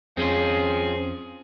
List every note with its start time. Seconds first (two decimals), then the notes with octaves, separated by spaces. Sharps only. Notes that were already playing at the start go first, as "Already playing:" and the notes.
0.17 F2 F3 C4 C#4 F4 G#4